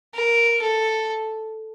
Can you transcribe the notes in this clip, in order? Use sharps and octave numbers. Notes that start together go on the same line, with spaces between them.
A#4
A4